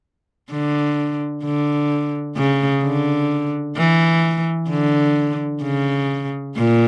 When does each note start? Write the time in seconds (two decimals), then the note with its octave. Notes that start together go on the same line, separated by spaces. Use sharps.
0.51 D3
1.44 D3
2.37 C#3
2.83 D3
3.77 E3
4.70 D3
5.62 C#3
6.56 A#2